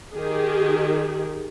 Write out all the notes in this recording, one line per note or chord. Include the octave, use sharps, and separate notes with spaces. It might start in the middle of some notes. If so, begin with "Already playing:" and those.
D#3 G4 G#4